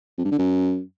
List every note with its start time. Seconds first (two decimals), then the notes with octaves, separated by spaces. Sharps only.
0.18 F2
0.25 G2
0.32 D3
0.39 F#2